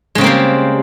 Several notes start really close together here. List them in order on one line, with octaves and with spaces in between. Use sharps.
G#3 C#3 C4 A#3 G3